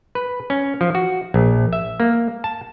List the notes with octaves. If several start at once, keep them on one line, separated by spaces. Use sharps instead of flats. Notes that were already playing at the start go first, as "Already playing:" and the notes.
B4
C#4
F3
F#4
A#1
E5
A#3
A5